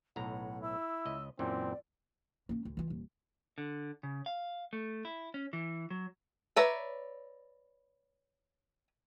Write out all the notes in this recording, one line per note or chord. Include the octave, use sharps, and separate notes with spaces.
B1 A2 F#5 A#5
E4 E6
C#2 D#5
F#2 A#2 E3 C4 D5
A#3 C#4
D2
E3 F4
D#1
D3
C#3
F5
A3
E4
C#4
E3
F#3
B4 C#5 D5 E5 A#5